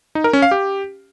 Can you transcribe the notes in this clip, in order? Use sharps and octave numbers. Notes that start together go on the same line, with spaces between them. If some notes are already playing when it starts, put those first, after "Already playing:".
D#4
A#4
C#4
F5
G4